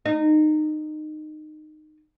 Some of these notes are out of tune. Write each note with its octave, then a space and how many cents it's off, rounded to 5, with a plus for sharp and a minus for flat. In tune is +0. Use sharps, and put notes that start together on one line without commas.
D#4 -20